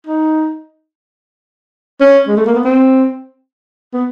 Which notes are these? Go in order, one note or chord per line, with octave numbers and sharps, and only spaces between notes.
D#4
C#4
G#3
A3
A#3
B3
C4
B3